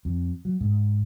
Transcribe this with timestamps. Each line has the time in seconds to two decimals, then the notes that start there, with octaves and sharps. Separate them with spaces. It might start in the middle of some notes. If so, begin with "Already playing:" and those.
0.05 F2
0.45 F#3
0.61 G#2